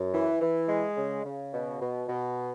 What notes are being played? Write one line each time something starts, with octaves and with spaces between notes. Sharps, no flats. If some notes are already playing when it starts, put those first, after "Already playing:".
Already playing: F#2
E3
E3
G#3
C#3
C#3
B2
B2
B2